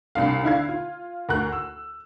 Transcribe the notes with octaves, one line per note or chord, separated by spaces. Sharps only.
C2 D4 F5
D3 E4 F5 G#6
F4
D2 A#4 F#6
E6